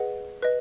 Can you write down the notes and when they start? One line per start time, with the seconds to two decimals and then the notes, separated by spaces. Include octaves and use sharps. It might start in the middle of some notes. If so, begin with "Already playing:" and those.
Already playing: G#4 B4 D#5 F#5
0.42 B4 D#5